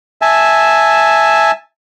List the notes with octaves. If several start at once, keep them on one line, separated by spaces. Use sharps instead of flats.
E5 G#5 A5